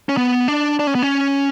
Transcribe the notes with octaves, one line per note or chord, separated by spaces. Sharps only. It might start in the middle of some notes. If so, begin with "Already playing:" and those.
C#4
B3
D4
D4
C#4
B3
C#4